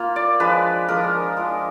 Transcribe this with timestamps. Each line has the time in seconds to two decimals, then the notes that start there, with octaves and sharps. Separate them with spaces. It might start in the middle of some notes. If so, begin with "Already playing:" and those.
Already playing: A#3 F4
0.16 D5
0.40 F3 G#3 D4 B4
0.89 F3 G#3 D4 A#4
1.37 G#3 D4 F4